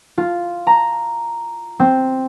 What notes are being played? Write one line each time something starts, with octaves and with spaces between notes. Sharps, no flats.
F4
A#5
C4